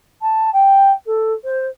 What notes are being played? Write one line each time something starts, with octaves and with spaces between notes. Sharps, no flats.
A5
G5
A4
C5